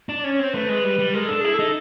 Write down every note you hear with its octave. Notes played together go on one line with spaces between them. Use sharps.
D4
D5
C#4 C#5
C#5
C4 C5
A3 B4
G#3
G3
G3
G#3 A#4
D4 A4
E4 G#4
A4
D#4